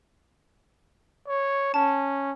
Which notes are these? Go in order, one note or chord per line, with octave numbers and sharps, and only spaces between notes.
C#5
C#4 A5